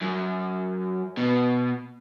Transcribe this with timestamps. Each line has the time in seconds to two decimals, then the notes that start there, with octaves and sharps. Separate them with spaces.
0.01 F#2
1.17 B2